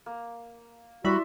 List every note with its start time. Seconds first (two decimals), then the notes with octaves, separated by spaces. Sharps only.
0.06 A#3
1.04 G3 E4 F#4 D5 E5 B5 C6